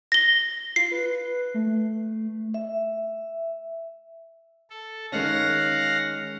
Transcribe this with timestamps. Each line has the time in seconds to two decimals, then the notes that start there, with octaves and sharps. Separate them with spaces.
0.12 A#6 G7
0.76 F4 C7
0.92 B4
1.54 A3
2.54 E5
4.70 A4
5.12 D#3 G#3 C#4 F5 F#5 A#6